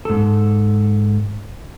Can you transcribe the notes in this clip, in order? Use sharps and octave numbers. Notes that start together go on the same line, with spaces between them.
G#2 A4